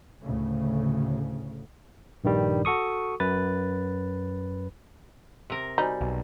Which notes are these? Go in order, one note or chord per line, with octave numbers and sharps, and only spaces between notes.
D2 A2 C#3
A#1 G2 D#3 G3
F#4 A4 C#6 D#6
F#2 B4 A6
C3 A#4
G3 D#4 F#4 C5 G#5
B1